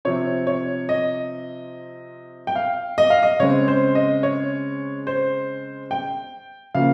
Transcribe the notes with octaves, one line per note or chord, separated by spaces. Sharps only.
C3 F3 C4 C#5
C#5
D#5
G5
F5
D#5
F5
D#5
C#3 G#3 C4 C#5
C5
D#5
C#5
C5
G5
C#3 F3 A#3 F5